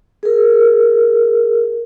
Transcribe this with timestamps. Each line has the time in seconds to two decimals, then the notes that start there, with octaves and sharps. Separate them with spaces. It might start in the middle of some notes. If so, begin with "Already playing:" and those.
0.23 G#4 A#4